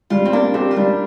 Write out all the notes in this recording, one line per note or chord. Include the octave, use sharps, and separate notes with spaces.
G3 F4
C4
A#3 D4
C4 G4
F4
G3 D4